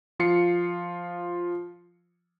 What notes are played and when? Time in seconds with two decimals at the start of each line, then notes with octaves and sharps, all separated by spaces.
0.19 F3 F4 C7 C#7